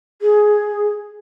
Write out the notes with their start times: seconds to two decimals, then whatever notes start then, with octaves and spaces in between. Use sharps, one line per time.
0.22 G#4